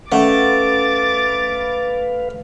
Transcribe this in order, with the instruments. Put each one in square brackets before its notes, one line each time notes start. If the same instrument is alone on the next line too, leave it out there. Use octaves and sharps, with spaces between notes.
[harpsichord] A3 [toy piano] C#4 D5 F#5 [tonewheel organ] B4 F5 [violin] D6 A6